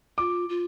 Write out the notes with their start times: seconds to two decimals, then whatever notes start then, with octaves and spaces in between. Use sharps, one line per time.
0.18 F4 D6
0.49 F4